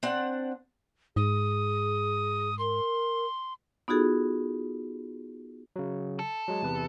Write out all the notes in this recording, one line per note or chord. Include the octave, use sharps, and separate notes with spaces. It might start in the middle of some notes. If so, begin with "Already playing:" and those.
C4 D4 F#5
G#2 G#4 D#6
A#4 C6
B3 D#4 F4 F#4 G#4 A4
C#3 F#3
A4
F#3 G#3
E2 C3 B4